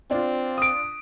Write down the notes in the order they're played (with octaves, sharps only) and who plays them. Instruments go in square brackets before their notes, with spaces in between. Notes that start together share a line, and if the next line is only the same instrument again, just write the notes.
[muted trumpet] C4 [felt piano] D4 F4
[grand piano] D#6 D7